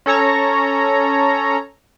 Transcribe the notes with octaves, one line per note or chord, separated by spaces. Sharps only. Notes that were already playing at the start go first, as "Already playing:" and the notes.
C#4 A4 C#5 A#5